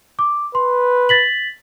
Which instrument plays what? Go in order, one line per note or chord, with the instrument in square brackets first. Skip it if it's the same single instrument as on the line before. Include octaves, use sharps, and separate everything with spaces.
[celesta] D6
[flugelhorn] B4 [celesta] C6
[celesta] A6 B6 F#7